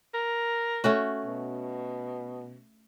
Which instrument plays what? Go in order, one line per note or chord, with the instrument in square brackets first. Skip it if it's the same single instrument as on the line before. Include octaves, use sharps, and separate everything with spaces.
[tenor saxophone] A#4
[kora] A3 C#4 F#4
[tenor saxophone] B2